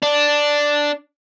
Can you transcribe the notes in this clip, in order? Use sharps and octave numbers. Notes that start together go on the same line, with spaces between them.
D4